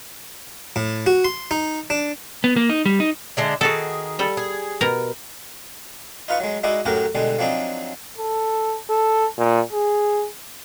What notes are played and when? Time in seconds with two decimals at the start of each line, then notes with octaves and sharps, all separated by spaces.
0.76 A2
1.06 F#4
1.25 C6
1.51 D#4
1.90 D4
2.44 B3
2.56 A#3
2.70 D#4
2.86 G3
3.00 D#4
3.37 D3 G#3 E4
3.61 D#3 F#4 G#4 A4
4.19 G3 A4
4.37 G#4
4.81 B2 A#4
6.28 D#4 F4 B4 C#6
6.40 F#3 G#3
6.63 G#3 D#4 E4 F#4 D5
6.85 F#2 A2 F#3 F#4 G4 A#4
7.15 B2 D3 G3 G#3
7.38 F3 F#3 C4 D4 D#4
8.18 A4
8.90 A4
9.38 A#2
9.73 G#4